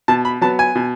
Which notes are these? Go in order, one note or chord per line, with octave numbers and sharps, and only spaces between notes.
B2 A5
B5
F#3 B3 A5
G#5
B2